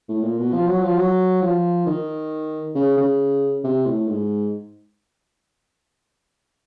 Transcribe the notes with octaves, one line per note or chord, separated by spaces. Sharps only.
A2
A#2
B2
F3
F#3
F3
F#3
F3
D#3
C#3
C#3
C3
A2
G#2